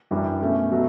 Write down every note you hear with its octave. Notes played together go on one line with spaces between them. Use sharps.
F#2 E3 G3 D4 G4
B2 A3 C#4
B2 F#3 A3